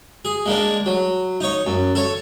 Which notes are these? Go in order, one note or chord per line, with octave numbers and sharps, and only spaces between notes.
G#4
G#3 A#3 D4
F#3
D#4 C#5
F#2
A4 C#5